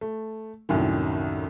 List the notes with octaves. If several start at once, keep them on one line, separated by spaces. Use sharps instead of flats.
A3
C2 F#2 A2 D#3